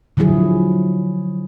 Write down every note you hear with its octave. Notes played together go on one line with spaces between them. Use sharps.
D3 F3 F#3 E4 G#4